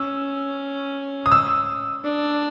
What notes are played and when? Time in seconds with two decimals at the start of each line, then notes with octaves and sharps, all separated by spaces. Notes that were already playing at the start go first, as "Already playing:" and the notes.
Already playing: C#4 E6
1.26 D#6
1.32 E6
2.04 D4